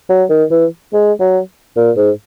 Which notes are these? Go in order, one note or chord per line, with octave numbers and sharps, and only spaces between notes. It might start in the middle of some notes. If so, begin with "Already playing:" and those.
F#3
D#3
E3
G#3
F#3
A#2
G#2